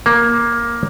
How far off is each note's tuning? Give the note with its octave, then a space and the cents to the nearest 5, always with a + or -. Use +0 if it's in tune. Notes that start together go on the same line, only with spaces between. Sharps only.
A#3 +10